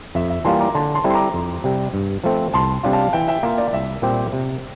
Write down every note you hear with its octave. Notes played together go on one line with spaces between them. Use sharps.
F2 E5
E5
E3 G3 A#3 F4 A5 C6
A#5 D6
D3 A5 C6
A5 C6
G3 C4 E4 A4
C6
A#5 D6
F2
C3 G3
G2
F3 A3 C4
C2 A5 C6
C3 G3 D4 F4
F5 A5
E3 E5 G5
E5 G5
A#3 F4 E5
D5
C2 E5
A#2 G3 C4 G4
C3